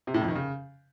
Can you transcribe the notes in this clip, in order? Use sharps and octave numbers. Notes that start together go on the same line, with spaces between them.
C3
A2
F2
D#3
C#3